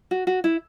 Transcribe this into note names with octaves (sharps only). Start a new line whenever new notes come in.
F#4
F#4
E4